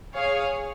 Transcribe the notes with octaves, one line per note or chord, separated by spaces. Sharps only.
G#4 C#5 F5